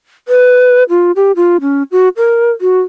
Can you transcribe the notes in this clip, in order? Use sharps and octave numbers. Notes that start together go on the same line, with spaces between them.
B4
F4
G4
F4
C#4
F#4
A#4
F#4